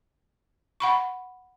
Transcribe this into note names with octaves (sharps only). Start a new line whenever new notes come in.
F#5 B5 C#6